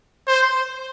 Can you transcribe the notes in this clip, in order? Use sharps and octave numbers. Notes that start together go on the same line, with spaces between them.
C5